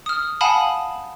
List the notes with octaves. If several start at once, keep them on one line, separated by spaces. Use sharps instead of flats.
D#6 F6
F5 F#5 G#5 A5 B5 D#6